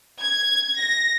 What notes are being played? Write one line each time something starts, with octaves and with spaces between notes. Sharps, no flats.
G#6
A#6